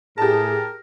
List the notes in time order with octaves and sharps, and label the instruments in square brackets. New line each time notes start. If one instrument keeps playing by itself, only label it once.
[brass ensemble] A2 G#4 [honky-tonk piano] G4 A5 [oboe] A#4